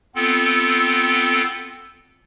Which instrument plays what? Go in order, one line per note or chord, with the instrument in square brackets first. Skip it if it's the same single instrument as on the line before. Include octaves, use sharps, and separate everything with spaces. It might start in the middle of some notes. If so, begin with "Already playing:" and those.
[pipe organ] B3 C4 F4 A4